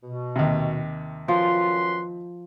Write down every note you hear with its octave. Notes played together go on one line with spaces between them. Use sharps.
B2
D#2 C3
F#2 F3 B4 C6